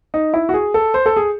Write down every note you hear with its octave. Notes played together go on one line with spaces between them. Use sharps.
D#4
E4
F#4
G#4
A4
C5
A4
G#4